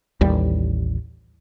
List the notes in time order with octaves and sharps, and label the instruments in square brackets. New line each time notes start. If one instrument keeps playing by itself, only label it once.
[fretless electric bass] A1 D#2 G3